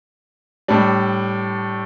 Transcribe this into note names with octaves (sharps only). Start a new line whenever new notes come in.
A2 G3 D4